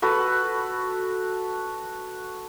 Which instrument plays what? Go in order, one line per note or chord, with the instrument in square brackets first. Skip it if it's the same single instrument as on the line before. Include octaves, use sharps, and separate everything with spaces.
[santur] F#4 A4 B4